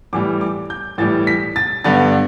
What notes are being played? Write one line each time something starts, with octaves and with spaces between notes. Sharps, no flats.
A2 E3 G3 D6
D6
G6
A2 E3 G3 A6
B6
A6
G2 D3 B3 D4 A6